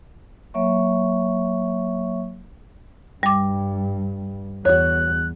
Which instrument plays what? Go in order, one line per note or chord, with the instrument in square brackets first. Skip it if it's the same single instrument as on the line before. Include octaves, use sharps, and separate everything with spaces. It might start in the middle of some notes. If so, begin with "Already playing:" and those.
[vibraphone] F#3 A#3 C#5 E5 C#6
[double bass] G2 [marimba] G3 D6
[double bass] E2 [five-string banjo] F#4 C#5 [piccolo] F#6